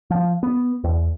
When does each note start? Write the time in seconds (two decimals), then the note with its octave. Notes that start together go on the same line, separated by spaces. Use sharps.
0.10 F3
0.43 B3
0.84 E2